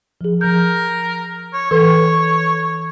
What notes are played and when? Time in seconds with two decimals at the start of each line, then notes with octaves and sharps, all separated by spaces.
0.21 F3 G#4
0.41 F3 A#4 G6
1.53 C#5
1.71 E3 A4 B4 C#5
1.93 A4